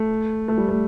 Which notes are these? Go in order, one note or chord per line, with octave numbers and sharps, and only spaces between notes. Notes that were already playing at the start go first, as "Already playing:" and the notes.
Already playing: A3
A3
G3
A3